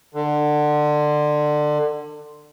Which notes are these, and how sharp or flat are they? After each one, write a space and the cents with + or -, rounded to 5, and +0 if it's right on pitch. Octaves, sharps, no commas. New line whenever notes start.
D3 +25